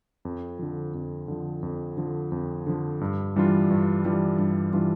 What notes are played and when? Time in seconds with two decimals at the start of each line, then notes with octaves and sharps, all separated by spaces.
0.25 F2
0.59 D3 F3
0.94 F2
1.28 D3 F3
1.63 F2
1.97 D3 F3
2.32 F2
2.67 D3 F3
3.01 G2
3.36 E3 G3 D4 F4
3.70 G2
4.05 E3 G3 D4 F4
4.39 G2
4.73 E3 G3 D4 F4